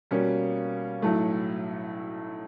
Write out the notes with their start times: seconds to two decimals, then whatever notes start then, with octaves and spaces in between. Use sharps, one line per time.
0.11 B2 G3 A#3 C#4
1.02 B1 A2 F#3 A3